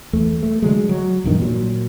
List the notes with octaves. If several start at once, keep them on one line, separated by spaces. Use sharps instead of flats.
E2 A3
A3
D3 F#3 G#3
F#3
B1 E2 G2 D#3
A#2 F#3